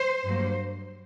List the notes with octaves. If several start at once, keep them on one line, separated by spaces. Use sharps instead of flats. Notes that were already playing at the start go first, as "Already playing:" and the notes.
Already playing: C5
G2 F#3 A#3